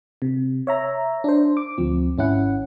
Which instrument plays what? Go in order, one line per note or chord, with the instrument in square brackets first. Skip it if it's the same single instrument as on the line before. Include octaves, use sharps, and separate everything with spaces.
[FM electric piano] C3
C#5 E5 A#5
D4 C5
D6
D2 F3 C4
G#1 C#4 E4 F#5